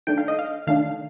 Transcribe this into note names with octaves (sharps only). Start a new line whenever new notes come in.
D#3 A3 D4 G5
F5
D#5
F5
D#3 A3 D4 F5